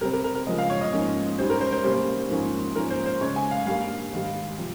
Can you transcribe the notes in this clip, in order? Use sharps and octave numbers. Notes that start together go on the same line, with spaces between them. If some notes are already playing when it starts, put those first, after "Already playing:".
C3 G3 C4 A#4
A#4
A#4
A#4
C#3 F3 G#3 D#5
F5
C#5
D#5
G#2 F3 A#3 C#4
G#2 G3 C#4 C5
A#4
C5
C5
C3 G3 A#3 C#4 C5
G#2 F3 A#3 C#4
G#2 F3 A#3 C#4 A#4
C5
C5
C#3 G#3 C#4 C#5
G#5
F5
G2 G3 A#3 F5
G#2 D#3 G3
C3 F3